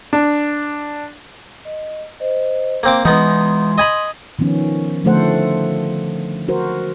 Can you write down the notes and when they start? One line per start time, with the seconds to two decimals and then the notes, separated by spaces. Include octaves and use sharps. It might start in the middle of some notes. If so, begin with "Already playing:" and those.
0.13 D4
1.65 D#5
2.20 C5 D#5
2.83 A#3 C4 D6
3.05 E3 G#3 B3 D#4 C6
3.78 D#5 G#5 B5
4.39 D#3 F3 B3 C#4
5.04 D3 F3 A3 A4 C5 F#5
6.48 F#4 A#4 C5